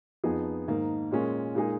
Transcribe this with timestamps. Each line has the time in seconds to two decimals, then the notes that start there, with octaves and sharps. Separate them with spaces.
0.24 F2 F3 B3 D#4 G#4
0.68 G#2 D#3 A#3 D#4
1.11 A#2 G#3 C#4 F4
1.55 A#2 G#3 D#4 G#4